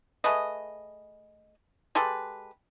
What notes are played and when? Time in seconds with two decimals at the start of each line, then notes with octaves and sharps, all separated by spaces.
0.24 A3 G#4 B4 D#5
1.95 G#3 G4 A4 B4